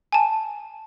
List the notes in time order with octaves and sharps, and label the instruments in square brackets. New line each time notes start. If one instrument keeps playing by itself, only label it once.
[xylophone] G#5 A5